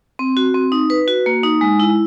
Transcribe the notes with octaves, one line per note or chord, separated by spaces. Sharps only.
C4
F#4
C4
D#4
B4
F#4
A#3
D#4
G#3
E4